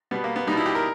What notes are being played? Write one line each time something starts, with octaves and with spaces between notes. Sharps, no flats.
B2 G3 B3
A#3
B3
B2 G3 D#4
E4
G4
A#4